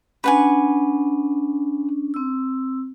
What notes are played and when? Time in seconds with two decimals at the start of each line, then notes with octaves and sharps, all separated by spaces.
0.24 C#4 D4 B4 F#5 G#5
2.14 C4 E6